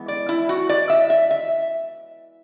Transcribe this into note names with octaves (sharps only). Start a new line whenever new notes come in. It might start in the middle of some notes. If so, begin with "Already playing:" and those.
Already playing: E3 G#3 B3
D5
E4
F#4
D5
E5
E5
E5